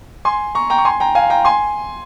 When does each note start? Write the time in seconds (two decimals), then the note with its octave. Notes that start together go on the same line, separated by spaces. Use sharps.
0.25 G#5 C6
0.55 A#5 C#6
0.70 G5 A#5
0.78 C#6
0.85 G#5 C6
1.00 G5 A#5
1.15 F5 G#5
1.30 G5 A#5
1.45 G#5 C6